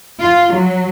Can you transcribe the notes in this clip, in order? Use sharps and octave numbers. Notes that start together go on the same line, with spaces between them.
F4
F#3